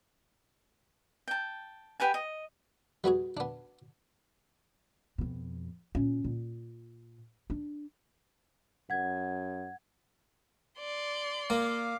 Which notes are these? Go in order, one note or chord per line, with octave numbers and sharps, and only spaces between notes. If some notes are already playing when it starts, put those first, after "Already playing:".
G5 A5
G4 B4 F#5 G#5
D#5
G3 B3 F#4 G#4
B3 D4
F2 B2
A#2 C#4
A#2
D4
F#2 F#5 G#6
D5 C6
A#3 F5 D6